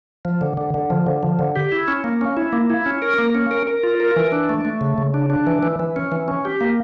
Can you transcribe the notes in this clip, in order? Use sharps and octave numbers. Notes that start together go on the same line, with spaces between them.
F3
D3
D3
D3
F3
D3
F3
D3
G4
E4
C#4
A#3
C#4
E4
A#3
E4
C#4
A#4
A#3
C#4
A#4
A#4
F4
A#4
E3
D4
A3
A3
C#3
C#3
D4
D4
E3
E3
E3
C#4
E3
C#4
G4
A#3